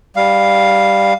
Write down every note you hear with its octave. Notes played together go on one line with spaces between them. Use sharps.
G3 F5